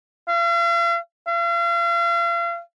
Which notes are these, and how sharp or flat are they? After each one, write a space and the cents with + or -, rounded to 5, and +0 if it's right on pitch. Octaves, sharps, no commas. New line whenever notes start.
F5 -45
F5 -40